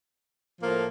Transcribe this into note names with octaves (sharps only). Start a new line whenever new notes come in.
A2 F3 A#3